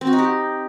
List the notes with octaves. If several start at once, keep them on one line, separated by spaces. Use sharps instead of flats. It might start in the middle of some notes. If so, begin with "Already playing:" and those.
C4
F#4
D#4
G4